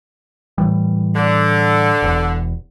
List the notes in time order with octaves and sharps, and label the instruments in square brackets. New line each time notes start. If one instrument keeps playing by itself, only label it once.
[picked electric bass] A2 E3 G3
[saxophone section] D3
[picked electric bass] E1 E2